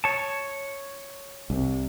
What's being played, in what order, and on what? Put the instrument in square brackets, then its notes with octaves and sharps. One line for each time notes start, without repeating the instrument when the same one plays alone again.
[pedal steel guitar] C#5 A5
[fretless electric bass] C2 C3